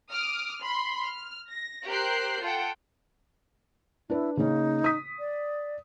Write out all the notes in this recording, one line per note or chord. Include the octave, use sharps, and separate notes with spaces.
D6 D#6 F6
B5 C6
F6
A#6
G4 A#4 C5 F#6 G6 C7
F4 A4 F#5 G5
D4 E4 B4
C#3 A#3 C#4 D#4
D#6 B6
D5